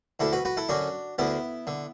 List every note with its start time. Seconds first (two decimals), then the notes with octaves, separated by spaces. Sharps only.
0.20 D2 D3 E4 A4
0.32 F#4 B4
0.45 F#4 B4
0.57 E4 A4
0.69 F#2 D3 D4 F#4
1.18 D2 D3 B3 E4
1.67 D3